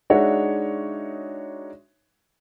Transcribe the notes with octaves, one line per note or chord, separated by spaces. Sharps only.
G#3 D4 D#4 F#4 C#5 E5